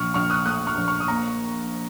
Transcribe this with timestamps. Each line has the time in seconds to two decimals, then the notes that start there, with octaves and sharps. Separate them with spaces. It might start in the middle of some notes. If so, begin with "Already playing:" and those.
Already playing: A#1 C#6 F6
0.14 A#1 C#6 F6
0.30 D#6 F#6
0.45 A3 D#6 F#6
0.67 C#6 F6
0.77 A#1
0.88 C#6 F6
1.00 D#6
1.08 A#3 A#5 C#6